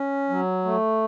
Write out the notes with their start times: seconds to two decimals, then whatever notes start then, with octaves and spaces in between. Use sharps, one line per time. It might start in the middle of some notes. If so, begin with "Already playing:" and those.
Already playing: C#4
0.30 F#3
0.65 A3